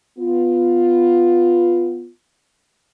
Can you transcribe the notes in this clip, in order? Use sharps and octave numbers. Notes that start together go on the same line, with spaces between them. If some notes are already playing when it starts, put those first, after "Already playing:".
B3 F4